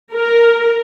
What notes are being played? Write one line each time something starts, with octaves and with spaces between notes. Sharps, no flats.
A#4